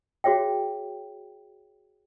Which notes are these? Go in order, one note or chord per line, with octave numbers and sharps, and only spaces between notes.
F#4 G#4 C#5 E5 G5